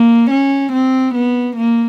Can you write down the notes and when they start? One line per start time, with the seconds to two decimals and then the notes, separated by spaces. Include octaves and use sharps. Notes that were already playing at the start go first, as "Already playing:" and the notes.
Already playing: A#3
0.31 C#4
0.73 C4
1.15 B3
1.57 A#3